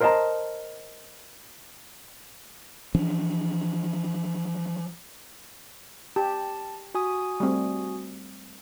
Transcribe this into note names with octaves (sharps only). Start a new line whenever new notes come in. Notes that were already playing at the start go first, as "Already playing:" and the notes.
A#4 C5 D#5 E5 A5 A#5
E3 F3 C#4 D4
G4 A5
F#4 G#5 D#6
G3 A3 C4